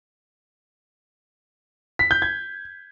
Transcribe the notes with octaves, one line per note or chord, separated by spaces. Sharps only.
B6
G6
G#6